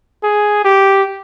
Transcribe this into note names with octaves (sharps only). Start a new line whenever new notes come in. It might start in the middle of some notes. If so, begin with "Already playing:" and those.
G#4
G4